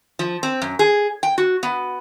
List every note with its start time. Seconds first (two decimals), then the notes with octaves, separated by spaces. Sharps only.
0.19 F3
0.43 C4
0.62 F#2
0.79 G#4
1.23 G5
1.38 F#4
1.63 B3